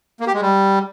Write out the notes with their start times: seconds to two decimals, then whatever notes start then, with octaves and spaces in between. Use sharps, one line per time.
0.20 A#3
0.27 G4
0.34 G#3
0.41 G3